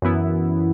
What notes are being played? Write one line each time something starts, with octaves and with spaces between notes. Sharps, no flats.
F#2 E3 B3 E4